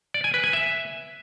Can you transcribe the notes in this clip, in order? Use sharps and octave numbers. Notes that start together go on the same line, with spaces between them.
D5
G#5
B4
G#5
E5